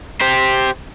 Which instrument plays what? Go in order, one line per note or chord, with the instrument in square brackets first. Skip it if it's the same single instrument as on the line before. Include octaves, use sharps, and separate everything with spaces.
[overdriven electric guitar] G4 C5